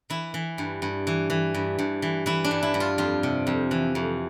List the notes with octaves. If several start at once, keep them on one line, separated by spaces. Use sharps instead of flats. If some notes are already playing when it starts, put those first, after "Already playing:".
E3 E4
E3
G2
G2
E3
E3
G2
G2
E3
E3 E4
D4
G2
E4
G2
F4
F2 F4
C3
F2
E3
F2